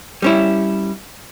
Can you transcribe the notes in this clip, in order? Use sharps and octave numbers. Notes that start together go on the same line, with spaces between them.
G3 C#4 E4